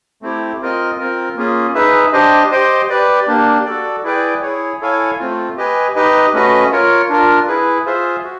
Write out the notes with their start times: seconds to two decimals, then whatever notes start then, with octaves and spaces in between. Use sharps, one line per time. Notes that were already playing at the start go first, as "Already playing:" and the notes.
0.22 A3 C4 E4 G4
0.61 C4 F4 A#4 D#5
0.99 C4 F4 A#4
1.36 A#3 C#4 F4 G#4
1.74 D#4 G#4 B4 E5
2.13 D4 G4 C5 D#5
2.51 G4 C5 D#5 G5
2.90 G4 B4 D5
3.27 A#3 D4 G4
3.66 F#4 A4 D5
4.04 E4 G#4 B4 D5 G5
4.42 E4 G#4 C#5
4.81 E4 A4 C#5 F5 G#5
5.19 A3 C4 F4
5.57 G4 B4 D#5 G#5
5.96 D#4 G4 B4 D#5
6.34 A3 C#4 F#4 B4 D#5
6.71 F4 A#4 C#5
7.09 D4 F4 A#4
7.47 E4 G#4 B4
7.86 F4 G#4 C5 E5
8.24 F#4